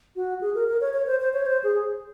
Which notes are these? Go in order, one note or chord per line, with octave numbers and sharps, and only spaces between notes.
F#4
G#4
A#4
A#4
C#5
C#5
C5
C5
C#5
C5
G#4